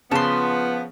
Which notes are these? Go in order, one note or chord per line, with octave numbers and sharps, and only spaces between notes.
C#3 F3 B3 A5 C6